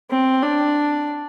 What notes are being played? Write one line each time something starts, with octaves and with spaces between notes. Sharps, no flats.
C4
D4